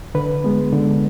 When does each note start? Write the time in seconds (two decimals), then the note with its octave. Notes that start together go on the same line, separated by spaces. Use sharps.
0.15 D3 B4
0.44 G#3 B3
0.72 D3